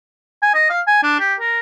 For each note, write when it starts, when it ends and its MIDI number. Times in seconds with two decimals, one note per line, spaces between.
0.42 0.53 80
0.54 0.69 75
0.70 0.81 77
0.87 0.99 80
1.03 1.17 62
1.20 1.34 67
1.40 1.60 70